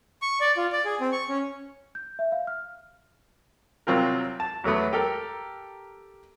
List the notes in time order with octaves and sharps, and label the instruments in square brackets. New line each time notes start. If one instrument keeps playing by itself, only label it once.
[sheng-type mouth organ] C#6
D5
F4
D5
G#4
C4
C#6
C#4
[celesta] G6
E5
F5
F6
[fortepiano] C2 F#3 C4 F4 A#4
A5
E2 F#3 A3 B3
G4 A4 A#4